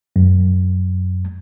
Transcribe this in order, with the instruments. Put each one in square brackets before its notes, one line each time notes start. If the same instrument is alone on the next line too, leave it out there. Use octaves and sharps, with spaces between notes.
[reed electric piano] F#2